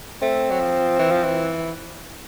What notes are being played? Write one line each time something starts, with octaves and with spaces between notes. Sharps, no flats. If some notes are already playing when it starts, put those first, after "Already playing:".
A3 C4
F#3
F3
E3
F3
E3